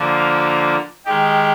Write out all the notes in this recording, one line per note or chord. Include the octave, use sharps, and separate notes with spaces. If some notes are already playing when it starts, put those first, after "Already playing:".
Already playing: D3 F3 A#3
D#3 G#3 D#4 G4